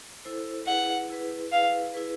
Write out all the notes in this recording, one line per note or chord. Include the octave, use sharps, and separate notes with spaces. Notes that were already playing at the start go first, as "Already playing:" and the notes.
E4 A4 C5
E4 G#4 B4 F#5
E4 G#4 B4
E4 G#4 B4 F5
E4 G#4 B4